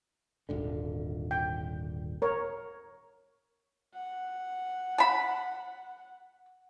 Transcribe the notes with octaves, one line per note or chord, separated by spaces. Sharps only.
D#1 G#1 D3
G5
A#4 C#5
F#5
A5 B5